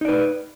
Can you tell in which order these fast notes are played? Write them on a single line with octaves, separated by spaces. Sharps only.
D#4 D5 B4